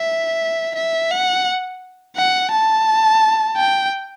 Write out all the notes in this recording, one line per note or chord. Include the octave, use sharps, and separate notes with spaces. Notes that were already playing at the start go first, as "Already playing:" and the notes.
Already playing: E5
E5
F#5
F#5
A5
G5